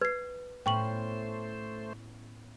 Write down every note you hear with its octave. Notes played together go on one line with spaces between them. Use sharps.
B4 G#6 C7
A2 A3 B3 C#4 C5 G5 C#6 F#7